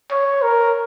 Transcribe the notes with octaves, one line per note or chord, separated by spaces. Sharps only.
C#5
A#4